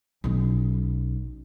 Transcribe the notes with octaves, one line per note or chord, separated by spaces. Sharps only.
B1 C#4